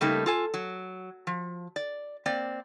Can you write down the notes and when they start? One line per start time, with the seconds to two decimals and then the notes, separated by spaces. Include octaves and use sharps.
0.01 C#3 G3 A3 A#3 D#4
0.26 F4 A4 G#5
0.54 F#3
1.27 F3
1.76 D5
2.26 A#3 C4 D5